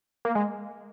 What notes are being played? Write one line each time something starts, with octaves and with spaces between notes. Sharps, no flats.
A#3
G#3